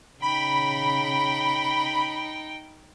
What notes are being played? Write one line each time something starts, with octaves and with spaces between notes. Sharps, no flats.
C#3 D#4 G5 B5